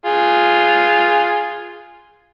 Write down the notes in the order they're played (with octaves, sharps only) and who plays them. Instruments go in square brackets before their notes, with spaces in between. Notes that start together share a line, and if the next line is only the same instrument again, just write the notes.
[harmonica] F4 G#4